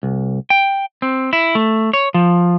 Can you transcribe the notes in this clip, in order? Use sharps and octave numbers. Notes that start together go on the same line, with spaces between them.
C2
G5
C4
E4
A3
C#5
F3